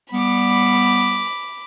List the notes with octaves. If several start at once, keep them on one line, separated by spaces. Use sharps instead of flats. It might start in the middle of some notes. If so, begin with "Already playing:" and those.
G3 B3 B5 D6